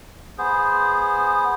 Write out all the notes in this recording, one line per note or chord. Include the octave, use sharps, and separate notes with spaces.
B3 G#4 C5